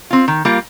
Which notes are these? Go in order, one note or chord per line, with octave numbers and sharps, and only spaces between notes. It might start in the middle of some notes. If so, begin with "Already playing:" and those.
C4 F4
D#3
G3 A#3 F4